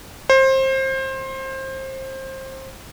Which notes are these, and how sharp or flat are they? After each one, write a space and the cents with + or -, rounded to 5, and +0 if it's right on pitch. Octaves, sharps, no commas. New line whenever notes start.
C5 +25